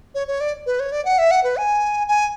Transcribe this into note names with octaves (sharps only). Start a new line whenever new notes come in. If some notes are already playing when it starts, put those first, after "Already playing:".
C#5
C#5
D5
B4
C#5
D5
F#5
E5
F#5
B4
G#5
G#5